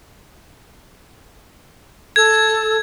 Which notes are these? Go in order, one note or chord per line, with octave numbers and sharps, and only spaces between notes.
A4 G#6